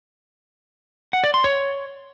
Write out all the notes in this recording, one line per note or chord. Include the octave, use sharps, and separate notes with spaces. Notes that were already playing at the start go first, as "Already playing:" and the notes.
F#5
D5
C6
C#5